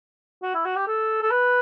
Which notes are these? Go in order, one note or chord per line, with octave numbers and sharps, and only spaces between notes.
F#4
E4
F#4
G4
A4
A4
B4